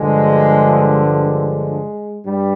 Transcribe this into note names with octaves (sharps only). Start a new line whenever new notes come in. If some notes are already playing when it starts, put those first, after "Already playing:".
Already playing: G2 D3 F3 G#3
G#3
G2 G3